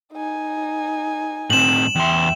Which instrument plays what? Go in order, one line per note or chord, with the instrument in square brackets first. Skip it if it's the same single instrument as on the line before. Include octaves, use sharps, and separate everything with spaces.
[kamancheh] D#4 G#5
[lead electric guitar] A2 C4 [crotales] E7 F#7
[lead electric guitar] E2 C6 [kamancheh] E5 G5